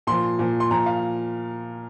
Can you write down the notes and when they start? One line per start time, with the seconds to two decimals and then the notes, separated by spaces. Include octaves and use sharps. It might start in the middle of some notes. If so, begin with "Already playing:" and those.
0.07 A#2 F3 C6
0.39 A#2 F3
0.60 C6
0.71 A#2 F3 A#5
0.86 F5